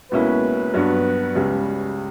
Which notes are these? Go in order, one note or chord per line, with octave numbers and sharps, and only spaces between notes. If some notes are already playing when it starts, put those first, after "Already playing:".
C#2 B2 A#3 C#4 E4 B4
G2 F#3 B3 D4
C#2 C#3 G3